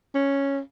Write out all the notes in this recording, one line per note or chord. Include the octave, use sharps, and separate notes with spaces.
C#4